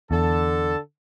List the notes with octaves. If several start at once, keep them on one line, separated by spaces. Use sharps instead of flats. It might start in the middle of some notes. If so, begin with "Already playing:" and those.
E2 D3 A4